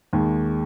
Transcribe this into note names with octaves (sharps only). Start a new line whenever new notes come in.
D#2 D#3 G#3